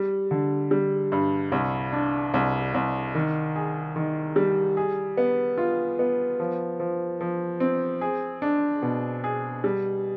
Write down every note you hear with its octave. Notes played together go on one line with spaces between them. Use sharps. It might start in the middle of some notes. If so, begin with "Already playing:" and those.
Already playing: G3
D3
G3
G2
C2
D4
C2
C2
D#3
G#4
D#3
G3
G#4
B3
F4
B3
F3
F3
F3
C4
G#4
D4
B2
G#4
G3